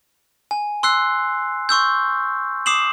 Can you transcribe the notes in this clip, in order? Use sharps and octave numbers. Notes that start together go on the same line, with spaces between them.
G#5
C6 E6 F#6 C7
C6 C#6 E6 G6
D6 D#6 C7 E7 F#7